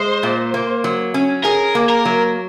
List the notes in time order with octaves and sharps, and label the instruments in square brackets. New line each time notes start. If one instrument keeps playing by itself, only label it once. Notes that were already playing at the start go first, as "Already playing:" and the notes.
Already playing: [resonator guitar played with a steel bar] G#3 [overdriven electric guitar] C5
[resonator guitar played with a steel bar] A#2
A#3
F#3
C#4
[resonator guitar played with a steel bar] G#4 [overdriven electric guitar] A#4
[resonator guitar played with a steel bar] A#3
[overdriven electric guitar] A#4
[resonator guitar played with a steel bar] F#3